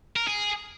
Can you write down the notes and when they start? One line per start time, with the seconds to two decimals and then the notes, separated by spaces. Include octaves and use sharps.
0.16 A#4
0.27 G#4